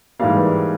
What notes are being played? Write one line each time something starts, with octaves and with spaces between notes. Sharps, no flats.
G#2 E3 G3 A#3 F5
B4